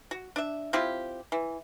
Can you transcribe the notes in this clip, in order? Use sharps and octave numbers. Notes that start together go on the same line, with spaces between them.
F#4
D4 E5
C4 E4 F4 G4
E3